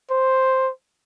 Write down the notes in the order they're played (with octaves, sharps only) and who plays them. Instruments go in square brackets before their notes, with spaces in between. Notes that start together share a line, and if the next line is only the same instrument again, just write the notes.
[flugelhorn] C5